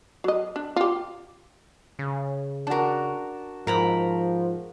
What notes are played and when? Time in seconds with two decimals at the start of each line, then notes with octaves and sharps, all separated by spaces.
0.24 F#3 D#5
0.56 D4
0.76 F4 G4
1.99 C#3
2.67 D4 F#4 A#4 A5
3.67 G#2 F3 A#4 A#5 B5